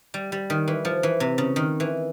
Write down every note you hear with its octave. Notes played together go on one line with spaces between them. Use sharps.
G3
G3
D#3
E3
F3
E3
C3
C#3
D#3
E3